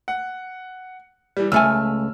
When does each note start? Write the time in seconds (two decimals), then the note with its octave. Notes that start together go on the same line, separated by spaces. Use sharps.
0.08 F#5
1.37 E3 G3
1.52 C#2 A3 G#5 E6 F6